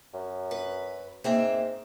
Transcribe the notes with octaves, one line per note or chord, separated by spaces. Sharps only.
F#2
B4
G#2 A#3 C4 E5